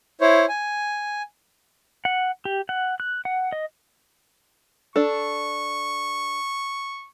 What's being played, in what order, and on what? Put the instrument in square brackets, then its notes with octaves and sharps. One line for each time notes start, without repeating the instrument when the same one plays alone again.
[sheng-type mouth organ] E4 C5 C#5
G#5
[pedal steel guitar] F#5
G4
F#5
F#6
F#5
D#5
[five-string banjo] D4 A4 [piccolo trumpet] C#6